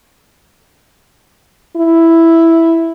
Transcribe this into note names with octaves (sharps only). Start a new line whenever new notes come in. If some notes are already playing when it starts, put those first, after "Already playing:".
E4